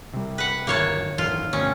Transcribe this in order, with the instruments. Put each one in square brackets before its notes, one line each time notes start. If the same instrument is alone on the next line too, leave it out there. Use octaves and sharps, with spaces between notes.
[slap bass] C3 G3
[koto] B4 F#5
[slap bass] D1 G1 D#3 [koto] A#3 C#5 A5
[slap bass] G#1 F#2 E3 [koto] F4
[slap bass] D2 G2 B2 [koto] C#4